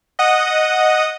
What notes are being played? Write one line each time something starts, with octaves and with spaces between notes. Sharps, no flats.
D#5 F#5 D#6